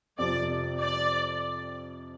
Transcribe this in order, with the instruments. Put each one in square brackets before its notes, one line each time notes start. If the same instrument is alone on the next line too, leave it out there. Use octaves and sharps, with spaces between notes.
[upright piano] F2 C3 F3 [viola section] D5
[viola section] D5